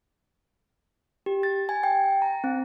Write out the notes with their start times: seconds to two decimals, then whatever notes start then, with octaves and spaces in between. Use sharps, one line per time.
1.26 G4
1.43 A6
1.69 G#5
1.83 G5
2.22 A#5
2.44 C4